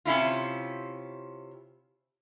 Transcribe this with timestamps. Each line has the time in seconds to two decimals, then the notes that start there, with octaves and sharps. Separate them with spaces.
0.05 C3 C#4 E4 F4